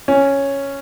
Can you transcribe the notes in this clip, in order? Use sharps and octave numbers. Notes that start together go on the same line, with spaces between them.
C#4